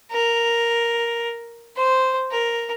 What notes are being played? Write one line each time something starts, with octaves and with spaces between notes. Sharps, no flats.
A#4
C5
A#4